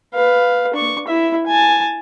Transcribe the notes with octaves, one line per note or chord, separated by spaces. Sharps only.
B4 F5
D4 C#6
E4 E5
G#5 A5